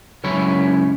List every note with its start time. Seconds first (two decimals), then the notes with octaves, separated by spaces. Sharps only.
0.24 C#2 F#2 C#4 E4 C#5